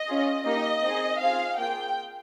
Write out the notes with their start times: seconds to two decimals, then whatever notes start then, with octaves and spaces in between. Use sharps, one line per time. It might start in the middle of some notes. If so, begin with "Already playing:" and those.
Already playing: D#5
0.08 C#4 F4 G#4
0.45 A#3 D#4 G4 D#5
0.83 C4 D#4 G#4
1.20 C4 F4 G#4 F5
1.57 A#3 F4 G#4 G5